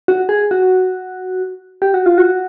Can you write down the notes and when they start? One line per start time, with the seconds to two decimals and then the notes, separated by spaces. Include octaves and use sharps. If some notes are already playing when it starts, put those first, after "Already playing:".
0.08 F#4
0.29 G#4
0.51 F#4
1.82 G4
1.94 F#4
2.06 F4
2.18 F#4